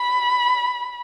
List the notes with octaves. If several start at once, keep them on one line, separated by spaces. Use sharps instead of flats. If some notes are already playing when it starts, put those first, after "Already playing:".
Already playing: B5